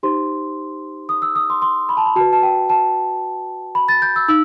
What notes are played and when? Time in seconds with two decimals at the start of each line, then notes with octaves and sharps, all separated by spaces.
0.03 D#4 G4 C5 C6
1.09 D#6
1.22 E6
1.36 D#6
1.50 C6
1.62 C6
1.89 B5
1.97 A5
2.06 B5
2.16 F#4 A5
2.21 B4
2.33 A5
2.43 G5
2.70 A5
3.75 B5
3.89 A6
4.02 G6
4.16 E6
4.28 D#4 E6